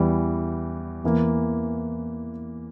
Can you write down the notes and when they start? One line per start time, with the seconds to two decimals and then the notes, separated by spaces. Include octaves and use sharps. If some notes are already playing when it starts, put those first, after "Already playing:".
Already playing: E2 E3 G3
1.04 E2 E3 A#3